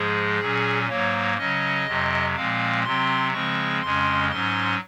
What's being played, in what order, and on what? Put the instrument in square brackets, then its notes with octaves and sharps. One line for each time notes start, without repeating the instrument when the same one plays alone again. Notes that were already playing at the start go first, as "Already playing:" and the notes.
Already playing: [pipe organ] G#2 F3 G#3 G#4
A#2 F#3 C#4
G#2 F#3 A#3 C#5
C#3 F#3 C#4 D#5
F2 C3 F#3
A#2 F3 G#3 C4 F5
C3 F#3 C4 C6
C#3 F3 G#3 C4 C#6
F2 C#3 G#3 C#4 C6
G#2 F#3 C#4 C6